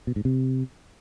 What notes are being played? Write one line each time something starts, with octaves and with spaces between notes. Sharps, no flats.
B2
G#2
C3